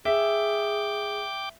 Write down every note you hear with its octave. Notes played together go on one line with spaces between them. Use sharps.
G#4 E5 G5 D6